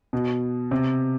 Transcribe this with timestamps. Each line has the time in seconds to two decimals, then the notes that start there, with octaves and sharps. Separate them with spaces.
0.13 B2
0.71 C3